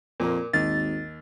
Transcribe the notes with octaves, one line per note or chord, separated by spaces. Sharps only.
F2 A#2 A#3
G#1 D#2 A6